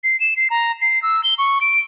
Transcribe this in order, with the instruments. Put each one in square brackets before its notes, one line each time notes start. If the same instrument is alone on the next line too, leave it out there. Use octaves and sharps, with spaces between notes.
[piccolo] C7
E7
C7
A#5
C7
E6
G7
C#6
D7